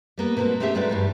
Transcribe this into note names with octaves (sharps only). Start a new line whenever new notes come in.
G3 A#3 B3
B2 A3 A#3 C4 F#4
A3 C4 C#4 G4 G#4 E5
G#2 G#3 A3 F#4 B4 D5
G2 E3 G3